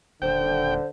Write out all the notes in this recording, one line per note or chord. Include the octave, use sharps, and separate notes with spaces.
D#1 D3 C5 G5